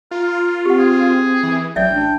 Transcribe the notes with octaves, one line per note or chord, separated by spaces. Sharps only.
F4 A#4
C4 G4 F#5
G#4
E3
A1 F#3 D5 E5 G5
D4